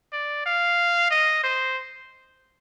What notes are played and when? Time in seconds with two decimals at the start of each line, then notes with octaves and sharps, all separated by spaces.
0.13 D5
0.46 F5
1.11 D#5
1.44 C5